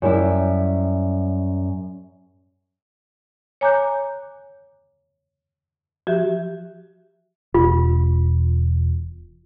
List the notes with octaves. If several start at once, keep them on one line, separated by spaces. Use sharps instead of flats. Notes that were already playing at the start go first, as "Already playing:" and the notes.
F#2 G3 E4
C#5 G#5 A#5 D6 F#6 G6
F3 F#4 G4 E5
E1 F4